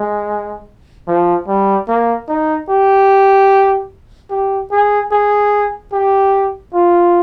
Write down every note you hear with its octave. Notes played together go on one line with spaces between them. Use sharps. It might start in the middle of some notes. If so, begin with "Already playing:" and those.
Already playing: G#3
F3
G3
A#3
D#4
G4
G4
G#4
G#4
G4
F4